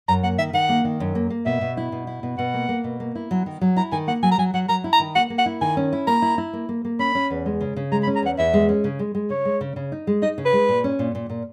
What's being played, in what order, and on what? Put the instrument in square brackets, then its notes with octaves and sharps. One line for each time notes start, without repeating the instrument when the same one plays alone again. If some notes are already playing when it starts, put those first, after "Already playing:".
[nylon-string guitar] F#2 [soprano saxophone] A#5
[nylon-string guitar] A#3 [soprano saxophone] F#5
[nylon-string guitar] D#3 [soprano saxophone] E5
[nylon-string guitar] D#3 [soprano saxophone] F#5
[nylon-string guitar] A#3
D#3
F#2
A#3
A#3
[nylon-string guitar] B2 [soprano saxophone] E5
[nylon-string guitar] B2
E4
B2
E4
B2
[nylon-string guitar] B2 [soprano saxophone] F#5
[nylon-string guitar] A#3
A#3
B2
A#3
E4
F#3
D#3
F#3
[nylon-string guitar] E4 [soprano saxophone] A#5
[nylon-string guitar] D#3 [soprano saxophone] G#5
[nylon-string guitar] A#3 [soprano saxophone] F#5
[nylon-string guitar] F#3 [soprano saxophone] G#5
[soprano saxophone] A#5
[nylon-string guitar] F#3 [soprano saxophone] G#5
[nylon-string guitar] F#3 [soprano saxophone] F#5
[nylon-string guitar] F#3 [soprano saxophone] A#5
[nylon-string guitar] E4
[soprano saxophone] A#5
[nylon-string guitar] D#3
[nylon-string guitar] A#3 [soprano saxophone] F#5
[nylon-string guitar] A#3
[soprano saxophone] F#5
[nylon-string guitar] E4
[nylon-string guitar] D#3 [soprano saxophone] G#5
[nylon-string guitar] C#4
E4
[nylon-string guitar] A#3 [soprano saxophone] A#5
[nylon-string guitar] E4
E4
A#3
A#3
A#3
[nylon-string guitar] C#4 [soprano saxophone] B5
[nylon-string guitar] C#4
E2
G#3
C#3
C#3
[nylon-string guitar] G#3 [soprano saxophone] A#5
[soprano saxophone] B5
[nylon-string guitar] C#4
[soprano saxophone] A#5
[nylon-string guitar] E2 [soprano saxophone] F#5
[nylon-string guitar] E2 [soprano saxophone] E5
[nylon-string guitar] G#3
C#4
C#3
G#3
G#3
[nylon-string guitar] C#3 [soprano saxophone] C#5
[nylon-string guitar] G#3
C#3
C#3
D#4
G#3
[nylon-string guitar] D#4 [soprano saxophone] D#5
[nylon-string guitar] C#3
[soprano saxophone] B4
[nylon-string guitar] G#3
A#2
C#4
A#2
A#2
A#2